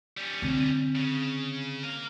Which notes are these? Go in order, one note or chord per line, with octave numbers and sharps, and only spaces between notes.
G3 C#4
D3 C4
C#3
A#4 F5